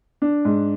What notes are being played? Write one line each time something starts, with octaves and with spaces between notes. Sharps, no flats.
D4
G#2